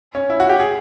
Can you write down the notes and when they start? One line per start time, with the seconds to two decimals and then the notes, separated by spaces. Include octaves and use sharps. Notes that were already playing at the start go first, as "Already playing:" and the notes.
0.15 C#4
0.30 E4
0.40 F#4
0.49 G4
0.60 G#4